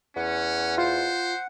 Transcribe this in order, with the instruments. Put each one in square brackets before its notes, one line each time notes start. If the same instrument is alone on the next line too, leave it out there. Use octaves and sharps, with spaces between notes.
[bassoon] E2 [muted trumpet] C#4 [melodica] F#5
[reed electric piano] F4 [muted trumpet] C5